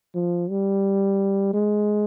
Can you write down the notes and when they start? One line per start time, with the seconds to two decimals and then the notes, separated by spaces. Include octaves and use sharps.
0.15 F3
0.50 G3
1.53 G#3